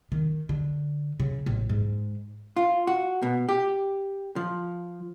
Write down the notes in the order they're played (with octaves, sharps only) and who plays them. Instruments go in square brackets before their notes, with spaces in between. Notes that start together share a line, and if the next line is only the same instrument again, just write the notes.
[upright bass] D#3
D3
C#3
A1
G#2
[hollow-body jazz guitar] F4
F#4
B2
G4
F3